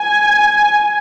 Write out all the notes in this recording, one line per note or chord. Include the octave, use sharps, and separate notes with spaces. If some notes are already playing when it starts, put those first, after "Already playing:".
Already playing: G#5